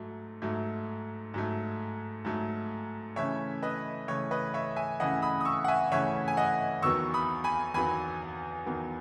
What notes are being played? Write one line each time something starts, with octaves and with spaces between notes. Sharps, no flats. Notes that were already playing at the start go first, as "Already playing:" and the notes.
Already playing: G#2 F#3 A3
G#2 F#3 A3
G#2 F#3 A3
G#2 F#3 A3
C#3 E3 A3 C#4 C#5 E5
B4 D#5
C#3 E3 A3 C#4 C#5
B4 D#5
C#5 E5
E5 G#5
C#3 E3 A3 C#4 D#5 F#5
B5 D#6
D#6
C#6 E6
F#5
E5 G#5
C#3 E3 A3 C#4 C#5 E5
G#5
D#5 F#5
E2 D#3 F#3 B3 C#6 E6
B5 D#6
G#5 B5
E2 D#3 F#3 B3 G#5 B5
E2 D#3 F#3 B3